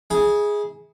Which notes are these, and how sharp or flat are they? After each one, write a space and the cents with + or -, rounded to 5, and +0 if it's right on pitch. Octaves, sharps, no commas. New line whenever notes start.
E4 -35 G#4 +0